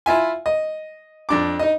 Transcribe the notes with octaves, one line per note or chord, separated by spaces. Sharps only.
E4 F4 E5 G#5
D#5
F2 D4 D6
D#4 D#5